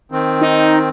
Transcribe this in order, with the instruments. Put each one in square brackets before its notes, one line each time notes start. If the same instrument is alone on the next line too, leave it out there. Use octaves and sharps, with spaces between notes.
[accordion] D#3 C4
[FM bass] D#4